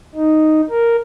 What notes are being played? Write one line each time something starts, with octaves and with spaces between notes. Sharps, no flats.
D#4
A#4